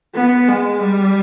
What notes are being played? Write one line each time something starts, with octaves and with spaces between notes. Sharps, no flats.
B3
G#3
G3